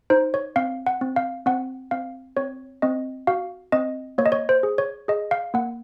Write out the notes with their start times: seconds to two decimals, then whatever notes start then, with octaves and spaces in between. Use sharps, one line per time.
0.10 D#4 C5
0.34 C#5
0.56 C4 F5
0.86 F#5
1.01 C4
1.16 F5
1.46 C4 F#5
1.91 C4 F5
2.37 C4 C#5
2.82 C4 D#5
3.27 F#4 F5
3.72 C4 D#5
4.18 A#3 C#5
4.26 D#5
4.32 C#5
4.49 C5
4.63 G#4
4.78 C#5
5.08 G#4 D#5
5.31 F5
5.54 A#3 F#5